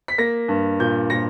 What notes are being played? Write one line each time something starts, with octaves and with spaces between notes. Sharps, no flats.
B6
A#3 A#6
G2
A#2 G6
A#2 A#6